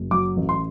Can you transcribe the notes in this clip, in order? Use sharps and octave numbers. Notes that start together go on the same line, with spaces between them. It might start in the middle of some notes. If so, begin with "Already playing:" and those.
Already playing: F#1
F#3 D6
A1
C6